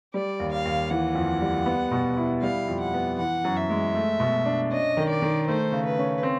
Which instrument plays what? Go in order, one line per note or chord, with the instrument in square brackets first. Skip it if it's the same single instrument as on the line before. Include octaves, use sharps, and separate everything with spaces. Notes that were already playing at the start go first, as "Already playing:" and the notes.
[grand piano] G3 [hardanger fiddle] D5
[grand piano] D#2
[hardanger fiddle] F5
[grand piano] D#2
[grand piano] E3 [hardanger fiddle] F#5
[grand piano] F2
G3
B3
B2
E4
[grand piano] G3 [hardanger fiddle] F5
[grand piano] F2
[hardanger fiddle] F#5
[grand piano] B3
[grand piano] E3 [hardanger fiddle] F#5
[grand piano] F#2
[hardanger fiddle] E5
[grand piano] G#3
A3
B2
D4
[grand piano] C#4 [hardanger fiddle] D#5
[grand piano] D#3
[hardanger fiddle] D5
[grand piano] D#3
[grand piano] A3 [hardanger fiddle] C5
[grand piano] C#3
[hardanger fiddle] B4
[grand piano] C#4
C4